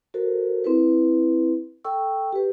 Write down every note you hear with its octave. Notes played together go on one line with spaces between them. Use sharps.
F#4 A4 A#4 C5
C4 E4 B4
A4 G5 C#6 E6
G4 B4